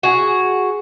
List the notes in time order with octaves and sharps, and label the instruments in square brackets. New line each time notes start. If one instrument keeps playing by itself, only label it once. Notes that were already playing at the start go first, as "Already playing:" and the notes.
[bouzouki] F#4 G#4